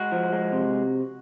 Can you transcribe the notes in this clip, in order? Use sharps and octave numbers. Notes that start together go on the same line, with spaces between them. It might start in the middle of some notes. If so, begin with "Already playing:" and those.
Already playing: G#3 F#4
F3
G#3
C3